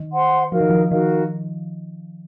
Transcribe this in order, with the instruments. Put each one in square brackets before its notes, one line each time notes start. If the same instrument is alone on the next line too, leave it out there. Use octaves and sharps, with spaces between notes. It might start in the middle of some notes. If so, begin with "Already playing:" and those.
Already playing: [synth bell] D#3
[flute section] C5 F#5 C6
[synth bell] F3 [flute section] D#4 F#4 A#4 F5
[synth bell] D#3
F3
[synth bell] D#3 [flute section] D#4 F#4 A#4 F5